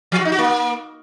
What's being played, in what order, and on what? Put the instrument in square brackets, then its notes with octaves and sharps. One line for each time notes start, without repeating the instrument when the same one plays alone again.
[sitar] F3
F#4
D#4
F#4
A#3